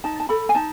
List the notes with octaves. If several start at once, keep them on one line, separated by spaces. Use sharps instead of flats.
D#4 A5
A5
A4 B5
G#5
D#4 A5